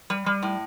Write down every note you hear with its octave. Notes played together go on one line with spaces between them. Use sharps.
G3
G3
A2